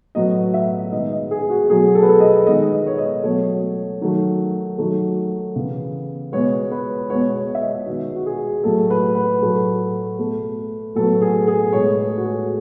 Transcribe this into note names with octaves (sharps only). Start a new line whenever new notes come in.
A2 F#3 B3 D#5
E5
D#3 G#3 B3 D#5
D#5
G#4
G#4
F#4
B2 F#3 A3 G#4
A4
B4
A4
D#5
D#3 G#3 B3 D#5
D#5
C#5
D#5
B2 F#3 A3 C#5
D#3 F#3 A3
D#3 F#3 A3
C#3 E3 B3
B2 G#3 B3 C#5
B4
B2 G#3 B3 C#5
C#5
E5
D#5
D#3 G#3 B3 F#4
F#4
G#4
A2 F#3 A3 A4
B4
B4
A2 F#3 A3
B2 A3
A2 F#3 B3 A4
G#4
G#4
A2 G#3 B3 C#5
A4
F#4
G#4